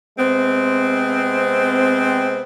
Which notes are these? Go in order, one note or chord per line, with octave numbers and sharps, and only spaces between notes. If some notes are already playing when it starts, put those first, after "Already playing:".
C3 G#3 B3 C4